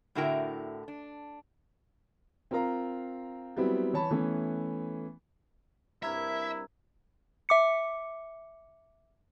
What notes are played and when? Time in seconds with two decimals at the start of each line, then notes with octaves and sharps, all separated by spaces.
0.15 A2 D3 E4 F#4 A#4 G5
0.88 D4
2.51 C4 F4 A#4 F5 A#5
3.57 F#3 G3 B3 C4 E4
3.93 E3 C#5 A5 B5
4.11 E3 A3 B3 C#4
6.03 G2 C3 E4 A#4 E5 A#5 E6 G#6
7.49 E5 D6 C#7